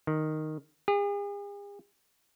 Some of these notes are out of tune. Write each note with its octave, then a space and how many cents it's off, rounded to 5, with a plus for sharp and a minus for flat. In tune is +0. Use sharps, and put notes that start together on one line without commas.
D#3 -5
G#4 -45